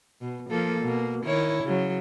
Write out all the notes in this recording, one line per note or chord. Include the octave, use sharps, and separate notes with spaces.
B2
F3 A#3 A4
B2 A#3
D#3 E4 C#5
C#3 F#3